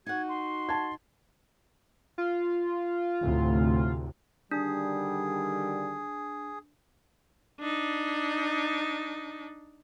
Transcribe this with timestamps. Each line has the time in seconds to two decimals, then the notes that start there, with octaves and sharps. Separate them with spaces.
0.06 D#4 F#4 F#5 G#6
0.29 C6
0.69 A5 G#6
2.18 F4
3.21 D2 A2 C3
4.51 D3 D#3 G3 D4 G#4
7.60 D4 D#4